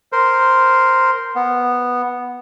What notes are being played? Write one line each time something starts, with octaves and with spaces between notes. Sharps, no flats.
A#4 C5
B3